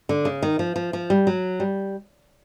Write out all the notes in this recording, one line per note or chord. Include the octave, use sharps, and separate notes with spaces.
D3
C#3
D#3
F3
F3
F3
G3
F#3
G3